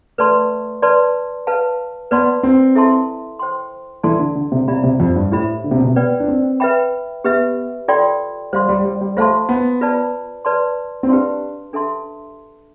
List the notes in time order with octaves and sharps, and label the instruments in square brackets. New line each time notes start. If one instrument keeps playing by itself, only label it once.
[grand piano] A3 [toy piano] B4 D5 A5 C6
[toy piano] B4 D5 A5 C6
B4 F5 A5
[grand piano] B3 [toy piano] B4 D5 A5 C6
[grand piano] C4
[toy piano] E4 A4 E5 A5 C6
C5 G5 C6
[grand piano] E3 [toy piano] D4 A4 D5 A5 C6
[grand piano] D3
D3
C3
[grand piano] C3 [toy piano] E4 G4 D5 F5 B5
[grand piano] C3
F2
G2
[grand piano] A2 [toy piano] D4 G4 C5 E5 B5
[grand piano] D3
C3
B2
C3
[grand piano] B3 [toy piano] B4 D5 G5
[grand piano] D4
C4
[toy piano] B4 E5 G5 B5
[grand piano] B3 [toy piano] G4 B4 E5
[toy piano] F4 A4 D5 G5 C6
[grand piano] G3 [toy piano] C5 F5 C6
[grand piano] G3
G3
G3
[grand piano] A3 [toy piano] F4 C5 F5 A5 C6
[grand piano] B3
[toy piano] F4 B4 D5 A5
B4 D5 A5 C6
[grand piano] C4
[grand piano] D4 [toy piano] G4 B4 F5 A5 C6
[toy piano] D4 A4 E5 A5 C6